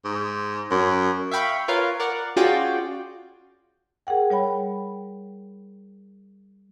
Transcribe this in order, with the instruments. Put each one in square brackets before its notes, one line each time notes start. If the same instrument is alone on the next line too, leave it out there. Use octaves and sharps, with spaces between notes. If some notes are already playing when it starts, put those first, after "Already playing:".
[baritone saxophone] G#2
F#2
[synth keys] E5 F5 G5 B5 C#6
F4 A#4 B4 C#5 F5
A#4 D5 F#5
C#4 F4 F#4 G#4 D5 G5
[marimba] G#4 A#4 F#5 G5
G3 C#5 G5 B5